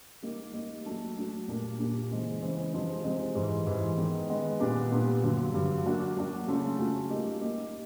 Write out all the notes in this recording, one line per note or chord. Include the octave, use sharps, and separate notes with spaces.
G3 A#3 D#4 G4
G3 A#3 D#4 G4
F#3 A3 D4
F#3 A3 D4
A#2 G3 A#3 D4
A#2 G3 A#3 D4
C#3 E3 G#3 C4
C#3 E3 G#3 C4
C3 F3 G#3 C4 D#4
C3 F3 G#3 C4 D#4
G#2 E3 G3
G#2 E3 G3
D#3 G#3 B3
D#3 G#3 B3
A#2 G3 B3 D4 G4
A#2 G3 B3 D4 G4
G2 D3 F#3
G2 D3 F#3
F#3 A#3 D4 F#4
F#3 A#3 D4 F#4
C#3 F#3 A3 C#4 F4
C#3 F#3 A3 C#4 F4
G3 A#3 D#4 G4
G3 A#3 D#4 G4